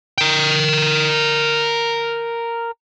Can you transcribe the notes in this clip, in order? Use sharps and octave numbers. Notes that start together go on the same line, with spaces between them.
A#4 G5